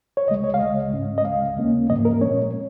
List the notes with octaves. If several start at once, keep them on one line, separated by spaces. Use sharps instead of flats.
C#5
C#2 C#3 G#3 D#5
C#5
F5
C#2 C#3 G#3 D#5
G#2 G#3 C#4
D#5
C#2 C#3 G#3 F5
D#2 C#3 A#3 C#4
G#2 F3 A#3 D#5
A#4
A#2 G#3 C#4 C#5
C#4